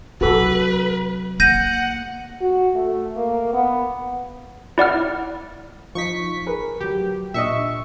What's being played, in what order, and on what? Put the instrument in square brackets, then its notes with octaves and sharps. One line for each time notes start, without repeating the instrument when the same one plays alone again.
[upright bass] C3 F#3 [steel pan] F#4 A4 [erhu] B4
[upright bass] A#3 [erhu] F#5 [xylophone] G6 A#6 D#7
[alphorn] F#4
A3
A#3
B3
[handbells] E4 D5 F#5 F6
[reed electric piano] F3 D#4 [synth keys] C#6 B6
[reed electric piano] G#4 A#4 B4
[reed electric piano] D2 F#3 [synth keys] G4
[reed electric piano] A#2 D4 D#5 [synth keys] E5 C#6